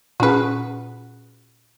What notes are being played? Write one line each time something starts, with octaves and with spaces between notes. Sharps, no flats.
A#2 C#4 F#4 G#4 B4